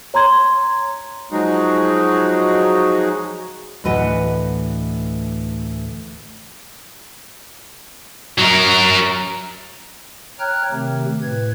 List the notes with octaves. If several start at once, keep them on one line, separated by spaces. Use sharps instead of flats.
C#5 A#5 C6 G#6
F3 F#3 G#3 D#4 F#4 G#4
D2 A2 E3 B4 D#5 F#5
F#3 A#4
C#5 G5 A#5 F6 F#6 G#6
C3 D#3 A3 C4 G4
A2 B4 G#6